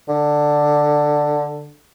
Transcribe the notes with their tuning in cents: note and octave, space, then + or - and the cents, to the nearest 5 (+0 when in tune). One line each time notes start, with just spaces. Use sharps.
D3 +5